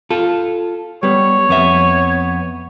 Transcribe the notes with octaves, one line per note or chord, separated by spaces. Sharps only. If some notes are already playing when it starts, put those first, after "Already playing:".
F4 A4
G3 B3 C#5
F2 B3 E5